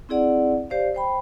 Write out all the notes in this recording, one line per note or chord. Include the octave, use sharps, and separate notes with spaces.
C4 E4 G#4 D5 F#5
G4 C5 D5 F5
C5 G5 B5